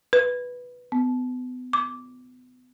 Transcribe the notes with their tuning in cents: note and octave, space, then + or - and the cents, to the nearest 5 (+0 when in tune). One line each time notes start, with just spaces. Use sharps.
B4 +0
B3 +30
D6 -10